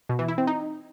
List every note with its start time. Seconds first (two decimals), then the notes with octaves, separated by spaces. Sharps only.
0.09 B2
0.19 E3
0.28 E4
0.38 C4
0.47 D#4